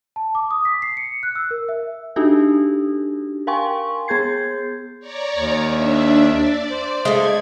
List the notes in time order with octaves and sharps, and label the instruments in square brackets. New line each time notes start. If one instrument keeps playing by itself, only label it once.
[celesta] A5
D6
D#6
B6
C7
C#7
F#6
E6
A#4
E5
[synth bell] D4 D#4 F#4 G4 A4
A#4 F5 G5 G#5 C6 C#6
B3 G#4 G6 G#6 C7
[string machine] C#5 D5 A#5
[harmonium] D#2
[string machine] D4 E5
D5
[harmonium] C5
[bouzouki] G#3 A3 [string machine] G#6